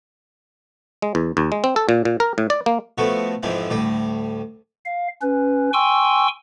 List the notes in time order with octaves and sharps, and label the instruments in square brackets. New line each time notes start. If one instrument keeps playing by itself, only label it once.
[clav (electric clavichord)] G#3
E2
D#2
G#3
C4
A4
A#2
A#2
A#4
A2
D5
A#3
[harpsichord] F3 A3 B3 F#4
F2 G#2 C3 E3 F3
D2 A2 G3
[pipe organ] F5
C#4 B4
G5 G#5 C6 C#6 E6